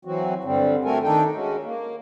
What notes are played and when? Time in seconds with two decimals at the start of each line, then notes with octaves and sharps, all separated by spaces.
0.05 E3 F#3 C4 F#4
0.44 G2 D3 G3 C4
0.85 A3 C4 F#4 A4 A#4 G#5
1.03 D#3 D4 D#4 A4 G5
1.35 G#3 C#4 F#4
1.64 A#3